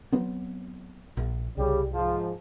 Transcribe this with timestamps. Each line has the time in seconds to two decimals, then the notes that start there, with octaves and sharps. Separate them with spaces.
0.12 F#3 B3 C4
1.17 A#1
1.57 C2 C#3 G3
1.91 G#2 F3